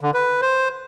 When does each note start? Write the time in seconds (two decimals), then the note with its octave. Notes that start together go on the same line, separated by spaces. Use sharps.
0.01 D3
0.14 B4
0.42 C5